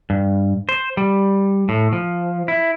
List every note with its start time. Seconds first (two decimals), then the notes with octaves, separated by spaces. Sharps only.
0.10 G2
0.69 C5
0.97 G3
1.69 A2
1.93 F3
2.48 E4